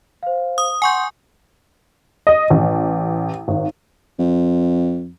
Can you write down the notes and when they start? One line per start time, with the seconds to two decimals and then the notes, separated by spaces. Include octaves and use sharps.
0.23 C5 F5
0.58 D#6
0.82 F#5 G#5 C6 C#6 G6
2.27 D#5
2.50 A1
3.48 G#1
4.19 F2